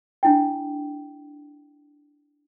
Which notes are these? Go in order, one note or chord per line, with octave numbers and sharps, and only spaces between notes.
D4 E4 G5